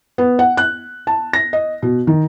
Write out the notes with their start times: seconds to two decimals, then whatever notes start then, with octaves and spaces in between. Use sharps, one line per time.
0.18 B3
0.39 F#5
0.57 F#6
1.07 A5
1.33 A#6
1.53 D#5
1.82 B2
2.07 D#3